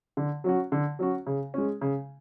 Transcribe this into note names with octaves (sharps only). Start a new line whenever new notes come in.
D3
F#3 C#4 F#4
D3
F#3 C#4 F#4
C#3
G#3 C#4
C#3